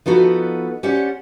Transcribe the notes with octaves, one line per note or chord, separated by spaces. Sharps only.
F3 B3 D#4 F#4 A4 B4
C#4 G4 C5 D5 F#5